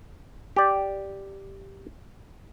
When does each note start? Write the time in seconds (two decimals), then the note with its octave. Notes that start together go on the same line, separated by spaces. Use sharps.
0.56 G4 D5